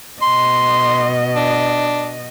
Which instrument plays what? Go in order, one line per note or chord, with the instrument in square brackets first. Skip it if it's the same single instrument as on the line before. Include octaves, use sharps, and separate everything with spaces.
[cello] B2 D#5 [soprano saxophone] C6
[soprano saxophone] D4